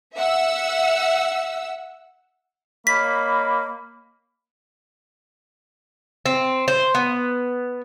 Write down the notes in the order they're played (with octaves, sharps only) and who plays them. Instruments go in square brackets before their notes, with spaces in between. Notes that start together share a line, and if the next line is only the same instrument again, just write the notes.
[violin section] E5 F#5 E6
[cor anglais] A#3 [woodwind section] C#5 D#5 B5 [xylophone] B6
[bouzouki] C4
C5
B3